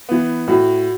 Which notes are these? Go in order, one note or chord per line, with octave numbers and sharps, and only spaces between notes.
E3 B3
A2 F#4